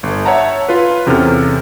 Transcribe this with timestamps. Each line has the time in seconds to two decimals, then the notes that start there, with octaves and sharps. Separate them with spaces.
0.03 G1
0.26 C#5 E5 F#5 A5 A#5
0.69 F4 B4
1.06 E2 C3 C#4 A4 F6